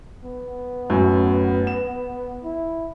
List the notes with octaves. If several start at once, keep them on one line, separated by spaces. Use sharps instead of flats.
B3
F#2 A2
E7
E4